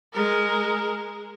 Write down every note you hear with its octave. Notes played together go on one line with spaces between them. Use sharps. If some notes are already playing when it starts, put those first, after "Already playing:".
G#3 A#4